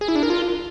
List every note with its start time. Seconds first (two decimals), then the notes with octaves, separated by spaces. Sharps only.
0.01 G#4
0.08 E4
0.16 D4
0.23 A#4
0.30 F4